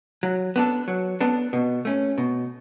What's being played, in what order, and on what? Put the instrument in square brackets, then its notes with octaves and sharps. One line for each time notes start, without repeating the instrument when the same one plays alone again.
[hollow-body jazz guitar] F#3
B3 D4 A4
F#3
B3 D4 A4
B2
A3 C#4
B2